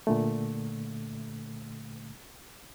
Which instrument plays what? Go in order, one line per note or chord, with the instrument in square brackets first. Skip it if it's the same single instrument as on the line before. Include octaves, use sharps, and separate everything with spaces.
[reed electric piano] A#2 D3 A3